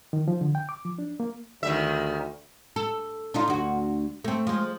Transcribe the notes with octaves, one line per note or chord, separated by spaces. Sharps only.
D#3
F3
D3
G5
D6
F3
D4
A#3
D2 D#3 G3 E5
A4
D4 D#4 F4
D2 F#4
A3 C4
F3 G#3